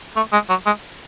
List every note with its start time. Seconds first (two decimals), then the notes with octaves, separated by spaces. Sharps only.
0.16 A3
0.33 G#3
0.49 F#3
0.66 G#3